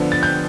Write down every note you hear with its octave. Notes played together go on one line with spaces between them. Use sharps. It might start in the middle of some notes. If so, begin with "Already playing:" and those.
Already playing: D3 F3 B3
A6
G6